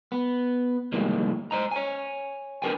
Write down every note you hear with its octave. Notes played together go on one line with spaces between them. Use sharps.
B3
C2 F2 A2 D#3 G#3 A#3
C5 D#5 A#5
C#5 G#5
D4 F4 A#4 B4 G5 G#5